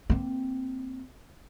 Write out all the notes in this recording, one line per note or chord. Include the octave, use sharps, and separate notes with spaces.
A#3 C4